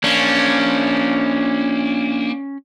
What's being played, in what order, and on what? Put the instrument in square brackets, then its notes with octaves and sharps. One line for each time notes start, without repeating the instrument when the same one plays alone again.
[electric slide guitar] A#3 D4 [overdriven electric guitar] C#4